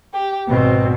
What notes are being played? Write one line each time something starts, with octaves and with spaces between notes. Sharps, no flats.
G4
G#1 B2 C4